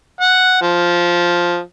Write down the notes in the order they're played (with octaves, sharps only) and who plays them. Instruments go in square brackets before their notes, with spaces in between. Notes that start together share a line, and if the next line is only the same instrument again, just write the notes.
[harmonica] F#5
F3